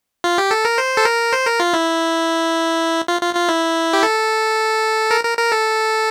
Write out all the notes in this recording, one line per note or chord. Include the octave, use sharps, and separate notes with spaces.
F4
G4
A4
A#4
C5
A4
A#4
C5
A#4
F4
E4
F4
F4
F4
E4
G4
A4
A#4
A#4
A#4
A4